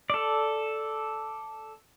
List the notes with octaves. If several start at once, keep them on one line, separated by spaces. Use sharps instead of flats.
A4 D5